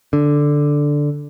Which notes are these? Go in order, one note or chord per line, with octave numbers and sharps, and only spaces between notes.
D3